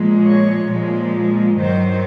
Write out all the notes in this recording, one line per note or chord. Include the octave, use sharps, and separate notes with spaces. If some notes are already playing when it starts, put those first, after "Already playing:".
Already playing: A#2 F3 G#3
C#5
A#2 F3 G#3
G2 D#3 F#3 C5